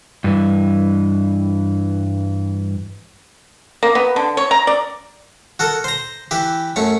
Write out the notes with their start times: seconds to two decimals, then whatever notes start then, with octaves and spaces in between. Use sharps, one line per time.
0.24 G2 E3
3.83 A#3
3.95 B3
4.16 D3
4.37 C#5
4.51 A#5
4.67 D5
5.59 F#4 A4 A#4
5.84 C5 A#5
6.31 E3 E4 G4
6.76 F#2 A3 C#5